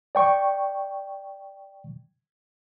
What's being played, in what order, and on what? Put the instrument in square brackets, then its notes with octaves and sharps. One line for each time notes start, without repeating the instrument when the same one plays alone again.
[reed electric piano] D5 G5 C#6